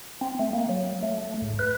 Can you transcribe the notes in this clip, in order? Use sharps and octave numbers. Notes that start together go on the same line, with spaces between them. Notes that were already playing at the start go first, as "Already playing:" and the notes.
C4
A3
A#3
F#3
A3
G#2
B4